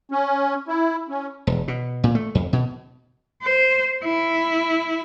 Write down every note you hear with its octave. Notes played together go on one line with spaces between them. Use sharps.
C#4
E4
C#4
E1
B2
A#2
A3
F2
B2
C5
E4